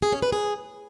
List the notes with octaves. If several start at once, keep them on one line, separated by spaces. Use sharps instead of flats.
G#4
C#4
B4
G#4